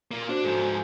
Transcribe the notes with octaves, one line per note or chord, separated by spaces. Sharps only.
A#3 F4
D4 F#4 C5
G#2 F3 A4 G6
G#5 A#5